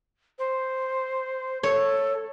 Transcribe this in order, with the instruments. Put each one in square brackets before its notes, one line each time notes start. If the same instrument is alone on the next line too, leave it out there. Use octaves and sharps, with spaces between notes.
[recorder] C5
[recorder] A4 [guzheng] C#5